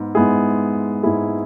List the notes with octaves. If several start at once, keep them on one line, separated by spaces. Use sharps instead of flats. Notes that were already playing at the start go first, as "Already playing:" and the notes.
Already playing: G#2 G#3 B3
G#2 G#3 B3 E4 G#4
G#2 G#3 B3 E4 G#4